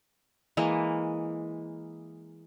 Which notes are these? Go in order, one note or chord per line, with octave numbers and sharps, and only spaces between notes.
E3 G#3 A#3